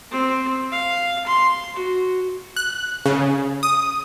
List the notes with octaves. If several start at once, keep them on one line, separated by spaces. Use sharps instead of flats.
C4
F5
C6
F#4
F#6
C#3
D#6